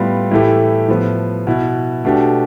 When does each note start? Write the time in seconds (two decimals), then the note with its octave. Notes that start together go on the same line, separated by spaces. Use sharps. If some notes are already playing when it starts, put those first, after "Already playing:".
Already playing: A2 G3 B3 F4
0.31 A2 E3 A3 E4 G4
0.88 A2 F3 B3
1.47 B2 B3 E4
2.05 B2 A3 D4 G4